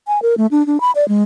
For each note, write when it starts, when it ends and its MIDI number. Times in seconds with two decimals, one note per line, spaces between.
0.08 0.21 80
0.22 0.35 70
0.38 0.47 57
0.51 0.65 62
0.67 0.80 62
0.81 0.91 83
0.96 1.07 74
1.08 1.23 56